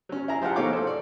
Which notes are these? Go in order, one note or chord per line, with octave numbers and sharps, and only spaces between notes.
F#3 C#4
E4 G#4 A#5
F3 G4 G#4 F5 F#5
B2 A3 D#4 C#5 F5 D6
A4 C5
D5